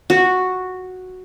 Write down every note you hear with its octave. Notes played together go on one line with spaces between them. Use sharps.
F#4